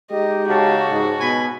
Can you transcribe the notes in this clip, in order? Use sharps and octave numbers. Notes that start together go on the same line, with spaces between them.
G#3 D#4 G4 D#5
C#3 F#4 A5
G#2
B2 G#5 B5